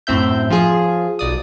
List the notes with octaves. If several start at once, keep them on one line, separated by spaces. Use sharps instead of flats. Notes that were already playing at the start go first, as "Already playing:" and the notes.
F#2 A2 C4 E5 G6
F3 F4 G#4
B1 D5 D#6